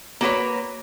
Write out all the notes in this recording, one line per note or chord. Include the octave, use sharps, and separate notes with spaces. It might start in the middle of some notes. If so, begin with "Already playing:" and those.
A#3 F#4 B4 C#5